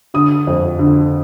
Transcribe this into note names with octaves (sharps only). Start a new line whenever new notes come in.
D3 D#6
F2
D3